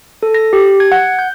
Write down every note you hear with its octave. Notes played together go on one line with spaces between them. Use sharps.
A4
A#6
G4
G#6
F#5
G6